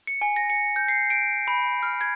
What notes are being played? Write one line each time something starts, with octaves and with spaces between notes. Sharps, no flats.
C#7
G#5
A#6
C#7
G6
C7
D7
B5
F6
G#6